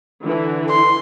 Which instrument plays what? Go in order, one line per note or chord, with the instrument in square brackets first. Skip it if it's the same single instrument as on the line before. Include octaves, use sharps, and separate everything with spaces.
[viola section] D3 E3
[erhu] C6